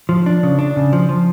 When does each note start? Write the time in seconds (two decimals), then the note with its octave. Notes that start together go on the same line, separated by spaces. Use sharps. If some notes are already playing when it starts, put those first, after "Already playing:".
0.09 F3
0.26 D4
0.43 C#3
0.59 D4
0.76 C#3
0.93 F3
1.09 F3